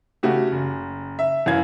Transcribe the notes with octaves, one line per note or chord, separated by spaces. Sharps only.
C#3 A3 F#4 G4
F#1
E5
F#2 E3 F5 G#6